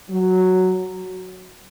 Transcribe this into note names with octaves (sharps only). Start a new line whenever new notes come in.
F#3